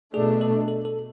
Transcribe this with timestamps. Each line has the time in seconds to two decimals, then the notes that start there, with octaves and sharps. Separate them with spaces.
0.14 B2 A3 D4 G#4
0.41 A4
0.68 A4
0.85 A4